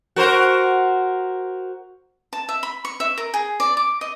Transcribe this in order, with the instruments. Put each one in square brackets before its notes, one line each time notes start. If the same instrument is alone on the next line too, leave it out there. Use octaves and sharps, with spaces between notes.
[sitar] F#4 A#4 C5
[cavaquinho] A5
E5
B5
C#6
E5
A#4
G#4
D5
D6
D#5